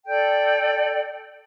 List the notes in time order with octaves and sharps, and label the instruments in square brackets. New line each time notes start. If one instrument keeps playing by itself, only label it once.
[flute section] A4 D5 G5